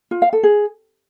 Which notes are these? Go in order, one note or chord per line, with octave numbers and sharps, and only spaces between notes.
F4
F5
A4
G#4